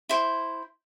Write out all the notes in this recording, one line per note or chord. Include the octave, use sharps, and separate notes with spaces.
E4 C5